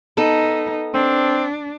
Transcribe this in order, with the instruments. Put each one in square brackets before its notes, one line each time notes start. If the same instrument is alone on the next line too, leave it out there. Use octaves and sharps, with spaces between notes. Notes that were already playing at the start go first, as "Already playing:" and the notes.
[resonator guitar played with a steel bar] B3 A4 [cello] D#4
[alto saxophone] C4 [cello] D4